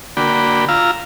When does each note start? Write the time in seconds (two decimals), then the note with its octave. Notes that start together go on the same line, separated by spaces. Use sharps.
0.17 D3 A#3 F#4 D5 G5 B5
0.69 F4 F5 A#5 E6